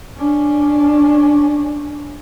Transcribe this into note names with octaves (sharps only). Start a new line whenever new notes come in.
C#4 D4